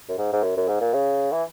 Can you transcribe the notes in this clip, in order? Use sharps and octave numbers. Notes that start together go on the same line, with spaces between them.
F#2
G#2
G#2
F#2
F#2
G#2
A#2
C#3
E3